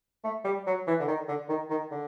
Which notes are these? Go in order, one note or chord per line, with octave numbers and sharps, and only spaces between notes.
A3
G3
F#3
E3
D3
D#3
D3
D#3
D#3
D3